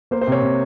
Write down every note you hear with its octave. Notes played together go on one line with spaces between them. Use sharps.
A#3 C5
C5
C3 C#5
C3